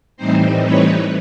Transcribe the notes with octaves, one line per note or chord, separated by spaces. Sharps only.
A2 E3 G3 C4 D#4 C5
B4 C#5